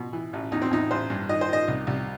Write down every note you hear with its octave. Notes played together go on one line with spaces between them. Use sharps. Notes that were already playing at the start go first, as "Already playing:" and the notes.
Already playing: B2
E3
A1
E2 D#4
C4
E2 D#4
A1 C5
G2
D#3 D#5
C5
D#3 D#5
C2
C2